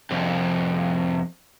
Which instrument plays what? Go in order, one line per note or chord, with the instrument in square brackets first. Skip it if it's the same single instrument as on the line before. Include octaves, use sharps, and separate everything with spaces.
[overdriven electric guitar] C2 F2